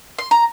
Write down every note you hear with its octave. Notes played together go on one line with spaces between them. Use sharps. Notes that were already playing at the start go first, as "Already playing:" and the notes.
C6
A#5